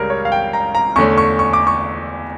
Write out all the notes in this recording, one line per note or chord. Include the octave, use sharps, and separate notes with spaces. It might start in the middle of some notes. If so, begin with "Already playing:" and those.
Already playing: C#2 C#3 G3 C#4 A#4
C#5
F5
G5
A#5
A#5
E2 D3 A3 C#4 C#6
C#6
C#6
D6
C#6